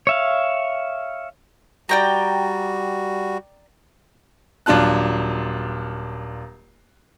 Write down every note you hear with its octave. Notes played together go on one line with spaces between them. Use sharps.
C#5 E5 F5
G3 F#4 D5 G5 A#5
D#1 F#3 D4 F4 A5 F#6